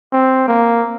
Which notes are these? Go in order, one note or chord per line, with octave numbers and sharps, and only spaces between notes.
C4
A#3